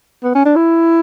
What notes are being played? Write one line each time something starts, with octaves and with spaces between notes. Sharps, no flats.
B3
C#4
D4
E4